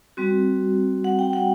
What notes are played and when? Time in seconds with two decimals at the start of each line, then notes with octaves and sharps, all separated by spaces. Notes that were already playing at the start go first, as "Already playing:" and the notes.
0.17 G3 C4 F#4
1.04 F#5
1.19 G5
1.33 F#5